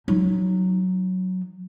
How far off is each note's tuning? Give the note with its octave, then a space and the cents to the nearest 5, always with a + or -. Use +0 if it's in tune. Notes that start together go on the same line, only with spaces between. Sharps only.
F#3 +0 D#4 +0